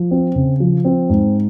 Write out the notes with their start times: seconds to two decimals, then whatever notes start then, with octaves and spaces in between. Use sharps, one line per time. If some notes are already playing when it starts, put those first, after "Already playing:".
Already playing: F3
0.11 C4
0.36 C#3
0.60 F3
0.85 C4
1.10 G#2